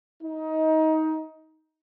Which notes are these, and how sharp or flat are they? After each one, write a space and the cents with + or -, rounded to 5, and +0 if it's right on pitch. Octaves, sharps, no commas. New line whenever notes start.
D#4 +20